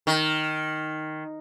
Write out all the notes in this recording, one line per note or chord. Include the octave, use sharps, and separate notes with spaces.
D#3